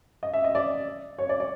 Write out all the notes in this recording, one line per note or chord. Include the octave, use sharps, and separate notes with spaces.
D#5
E5
D#5
D5
C#5
D5
D5